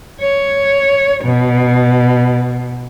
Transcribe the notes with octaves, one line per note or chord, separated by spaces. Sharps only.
C#5
B2